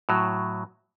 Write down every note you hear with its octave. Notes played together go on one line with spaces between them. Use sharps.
A2 F#3